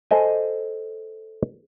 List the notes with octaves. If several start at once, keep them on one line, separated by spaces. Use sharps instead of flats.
A4 C5 D#5 G#5